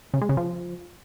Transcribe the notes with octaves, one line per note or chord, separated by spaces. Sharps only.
C#3
G#3
C#3
F3